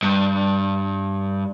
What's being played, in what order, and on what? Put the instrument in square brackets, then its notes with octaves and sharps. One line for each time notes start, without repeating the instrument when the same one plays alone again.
[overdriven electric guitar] G2